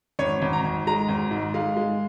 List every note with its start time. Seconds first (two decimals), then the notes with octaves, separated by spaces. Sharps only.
0.19 G#1 C#5
0.42 G#1
0.53 A#5
0.65 G#1
0.87 G#3 A#5
1.08 G#1
1.31 G#2
1.54 G#3 F5
1.77 G#3